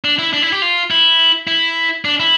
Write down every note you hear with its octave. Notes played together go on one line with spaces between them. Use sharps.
D4
E4
D4
E4
G4
F4
E4
E4
D4
E4